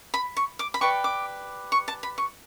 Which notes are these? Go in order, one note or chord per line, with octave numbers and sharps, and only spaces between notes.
B5
C#6
D6
B5
G4 B4 D5 C#6
D6
C#6
A5
B5
C#6